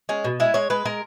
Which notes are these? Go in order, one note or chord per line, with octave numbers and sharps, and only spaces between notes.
G#3 C#4
B2
G#3 E4
G#3 C#5
G#3 B4
G#3 A#4